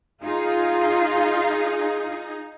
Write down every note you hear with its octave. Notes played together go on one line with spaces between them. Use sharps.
D#4 F4 G#4